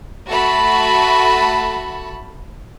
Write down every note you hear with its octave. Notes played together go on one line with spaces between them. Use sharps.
A3 F#4 A5 B5